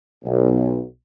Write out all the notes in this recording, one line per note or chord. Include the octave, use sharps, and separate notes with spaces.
B1